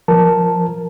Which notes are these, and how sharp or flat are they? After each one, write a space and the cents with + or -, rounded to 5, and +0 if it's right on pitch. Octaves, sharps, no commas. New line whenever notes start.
F3 +0 A#4 +0 A5 +0